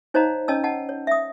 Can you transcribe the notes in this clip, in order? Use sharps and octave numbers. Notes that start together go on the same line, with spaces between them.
D#4 C5 C#5 D#5 F5 A#5
C#4 C#5 D#5 A5 E6
D#5 F#5 A5
C#5
E5 D#6